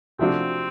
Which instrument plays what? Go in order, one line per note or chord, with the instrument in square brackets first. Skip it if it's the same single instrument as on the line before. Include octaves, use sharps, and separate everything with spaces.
[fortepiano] C3 F3 A3 D4 F#4 [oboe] C4